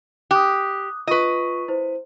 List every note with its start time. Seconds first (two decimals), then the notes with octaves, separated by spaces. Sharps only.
0.31 G4 D#6 F#6
1.07 F4 B4 D#5 C#6
1.68 E4 C5